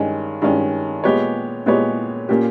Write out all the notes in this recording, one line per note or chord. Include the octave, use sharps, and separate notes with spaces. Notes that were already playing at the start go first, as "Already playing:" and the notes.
Already playing: G2 D#3 G#3 C#4
G2 D#3 G#3 C#4
A#2 G#3 B3 G4 C#5
A#2 G#3 B3 G4 C#5
A#2 A#3 C#4 G4